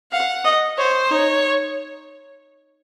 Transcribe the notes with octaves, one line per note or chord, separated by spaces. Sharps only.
F5 F#5
D#5
C5 C#5
D#4 C#5